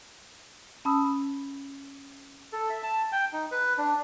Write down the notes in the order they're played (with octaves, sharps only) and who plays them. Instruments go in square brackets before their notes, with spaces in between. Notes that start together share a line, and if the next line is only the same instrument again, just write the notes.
[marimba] C#4 A5 B5 D#6 E6
[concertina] A4
E5
A5
G5
D#4
B4
D4